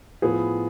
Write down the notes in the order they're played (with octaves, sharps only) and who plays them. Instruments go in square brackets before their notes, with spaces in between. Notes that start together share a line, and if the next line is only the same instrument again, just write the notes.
[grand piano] A2 F3 B3 F4 G#4